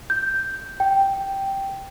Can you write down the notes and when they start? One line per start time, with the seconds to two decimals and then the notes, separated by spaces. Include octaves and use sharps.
0.10 G6
0.80 G5